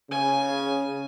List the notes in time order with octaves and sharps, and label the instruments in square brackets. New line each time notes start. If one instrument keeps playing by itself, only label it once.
[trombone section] C#3 [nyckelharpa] G#5